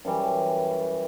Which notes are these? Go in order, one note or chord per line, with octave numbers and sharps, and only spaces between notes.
F#2 E3 G3 G#5